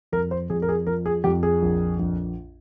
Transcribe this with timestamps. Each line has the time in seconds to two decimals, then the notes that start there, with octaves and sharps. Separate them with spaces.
0.12 F2 A#4
0.31 C5
0.50 F2 G#4
0.62 A#4
0.69 G#4
0.87 F3 A#4
1.06 G#4
1.24 F2 G4
1.43 G#4
1.62 A#1
1.99 A#1